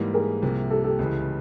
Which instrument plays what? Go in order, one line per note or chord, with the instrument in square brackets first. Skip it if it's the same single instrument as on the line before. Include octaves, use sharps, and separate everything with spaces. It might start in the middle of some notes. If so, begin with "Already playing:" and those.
Already playing: [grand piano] G#2 E3 G3 A#3
[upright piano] G#4 A#4
[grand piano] C2 C3 F3 A#3
[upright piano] G4 A4
G4 A4
[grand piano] C#2 C#3 E3